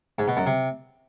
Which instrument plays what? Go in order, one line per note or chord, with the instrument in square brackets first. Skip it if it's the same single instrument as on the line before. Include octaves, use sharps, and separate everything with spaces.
[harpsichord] G#2
B2
F#2
C3